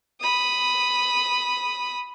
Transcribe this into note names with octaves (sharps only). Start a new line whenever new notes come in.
B5 D#6